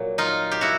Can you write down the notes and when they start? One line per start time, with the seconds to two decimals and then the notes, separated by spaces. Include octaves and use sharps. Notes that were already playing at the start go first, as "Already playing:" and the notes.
Already playing: A#2 F#3
0.18 D#4 F4
0.51 G4
0.61 E4 F#4